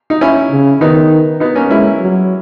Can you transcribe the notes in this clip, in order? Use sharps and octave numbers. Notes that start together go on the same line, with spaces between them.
D#4
C#4 E4
C#3
D#3 B3 D#4
B3 D#4
A#3 C#4
G#3 C#4 E4
F#3